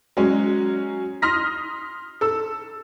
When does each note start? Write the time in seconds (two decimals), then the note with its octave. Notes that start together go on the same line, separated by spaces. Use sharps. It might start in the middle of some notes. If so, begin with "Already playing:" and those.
0.17 F#3 G#3 C#4
1.22 C6 D#6 F6 A#6 B6
2.21 A4 E6